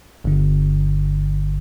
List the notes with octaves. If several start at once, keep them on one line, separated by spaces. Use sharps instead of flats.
G1 G2 D3